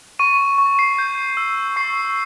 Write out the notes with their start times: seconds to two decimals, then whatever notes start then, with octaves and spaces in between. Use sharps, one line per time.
0.19 C#6 D#7
0.58 C#6
0.79 C7
0.98 G6
1.37 E6
1.76 C#6 C7